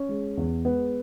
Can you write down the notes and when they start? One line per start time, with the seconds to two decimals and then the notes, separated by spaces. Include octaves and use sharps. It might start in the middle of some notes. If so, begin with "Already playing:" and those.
Already playing: C#4
0.09 G#3
0.37 E2
0.65 G#3 B3